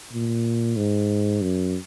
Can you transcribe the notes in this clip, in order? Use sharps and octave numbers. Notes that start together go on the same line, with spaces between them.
A#2
G#2
F#2